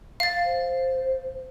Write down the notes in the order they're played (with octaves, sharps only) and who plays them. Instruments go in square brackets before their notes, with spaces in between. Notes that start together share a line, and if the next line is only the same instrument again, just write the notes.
[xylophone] F5 A6
[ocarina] C5